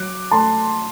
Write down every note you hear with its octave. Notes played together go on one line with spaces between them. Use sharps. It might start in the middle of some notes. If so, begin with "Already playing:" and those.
Already playing: F#3 D6 F#6
A3 A5 C6